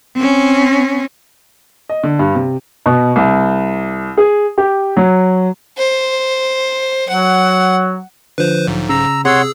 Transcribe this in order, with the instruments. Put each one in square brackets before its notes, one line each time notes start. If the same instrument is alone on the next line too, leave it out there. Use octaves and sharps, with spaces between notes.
[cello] C4 C#4
[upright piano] D#5
D3
G2
C3
B2
C2
G#4
G4
F#3
[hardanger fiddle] C5
[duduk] F#3 [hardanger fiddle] F#5
[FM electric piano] D3 F3 [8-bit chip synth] B4 C5
[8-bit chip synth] B1 G#2
[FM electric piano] C#3 [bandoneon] A#5 E6
[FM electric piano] C3 [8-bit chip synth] G#4 E6 [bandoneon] C#5 F#5 C6